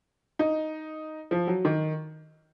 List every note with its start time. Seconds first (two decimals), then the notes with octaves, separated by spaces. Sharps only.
0.39 D#4
1.31 F3
1.47 F#3
1.65 D#3